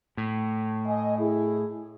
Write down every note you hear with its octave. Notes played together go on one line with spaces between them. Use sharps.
A2
D#5 G#5
E4 G#4